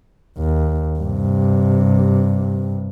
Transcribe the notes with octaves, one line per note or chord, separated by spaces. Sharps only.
D#2
G2 C3